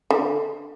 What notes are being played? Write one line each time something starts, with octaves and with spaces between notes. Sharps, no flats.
D3